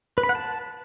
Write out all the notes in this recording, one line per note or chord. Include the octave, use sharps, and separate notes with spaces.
B4
B5
F#5
A5